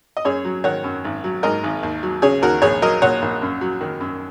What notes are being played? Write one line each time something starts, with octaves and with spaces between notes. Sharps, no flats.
D#5
F#2 G#4 C#5
F#3
D#3 C#5 F#5
F#2
G#1
F#3
G#2 A#4 D#5
G#1
D#2
F#3
C#3 G#4 C#5
D#2 F#4 A#4
A#1 G#4 C#5
F#3 A#4 D#5
A#2 C#5 F#5
A#1
F#2
F#3
D#3
F#2